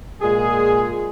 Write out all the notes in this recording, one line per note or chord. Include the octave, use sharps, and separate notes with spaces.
A#2 G#3 G#4